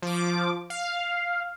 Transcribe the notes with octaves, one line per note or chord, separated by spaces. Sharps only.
F3 D6
F5